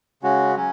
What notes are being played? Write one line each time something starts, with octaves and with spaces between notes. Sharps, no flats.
C#3 G#3 C#4 F#4
F#3 C#4